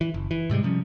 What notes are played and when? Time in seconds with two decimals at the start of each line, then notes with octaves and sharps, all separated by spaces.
0.01 E3
0.14 F#1
0.31 E3
0.50 G#2 C3 G3 G#3
0.63 C3 F3 G3 C#4